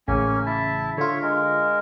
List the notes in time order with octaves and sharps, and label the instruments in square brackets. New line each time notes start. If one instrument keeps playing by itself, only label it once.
[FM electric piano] A1 C#3 [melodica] A#3 C#4 G#5
[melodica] E4 E5 A5
[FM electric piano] D3 F4 [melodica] C#5 E5
[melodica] G#3 A#4